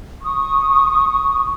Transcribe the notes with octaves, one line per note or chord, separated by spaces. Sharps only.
C#6 D#6